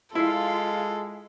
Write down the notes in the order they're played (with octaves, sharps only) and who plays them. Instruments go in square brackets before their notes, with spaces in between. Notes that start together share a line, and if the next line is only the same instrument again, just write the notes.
[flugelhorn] G#3 [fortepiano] E4 [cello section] F4 F5 [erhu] A4